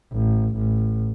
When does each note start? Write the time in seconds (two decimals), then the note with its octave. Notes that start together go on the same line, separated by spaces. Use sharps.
0.13 A1
0.57 A1